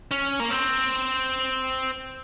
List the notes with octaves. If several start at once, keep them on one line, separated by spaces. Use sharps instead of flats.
C#4
A#3
C4